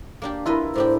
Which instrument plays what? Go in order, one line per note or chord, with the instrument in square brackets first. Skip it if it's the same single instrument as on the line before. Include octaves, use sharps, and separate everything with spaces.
[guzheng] A#3 D4 G4
[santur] E4 A#4 [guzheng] F4 B4 D#5
[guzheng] A2 D4 G4 [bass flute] C5